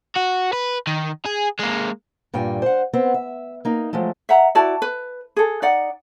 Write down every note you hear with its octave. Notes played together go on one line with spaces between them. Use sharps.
F#4
B4
D#3
G#4
G#3 A#3
G2 A#2 G3 G5 G#5
C5 F#5
B3 C4
E5
A#3 D#4
F3 F#3 G#3 A3
E5 F#5 A#5
E4 F#4 D5 A5
B4
G#4 A4
D#4 D5 F#5